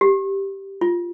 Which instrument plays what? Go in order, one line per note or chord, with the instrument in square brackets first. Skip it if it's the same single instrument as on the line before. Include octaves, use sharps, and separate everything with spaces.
[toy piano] G4
F4